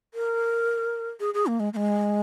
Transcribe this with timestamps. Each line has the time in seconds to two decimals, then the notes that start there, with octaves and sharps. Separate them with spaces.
0.14 A#4
1.20 G#4
1.34 G#4
1.47 A#3
1.60 G#3
1.73 A#3
1.76 G#3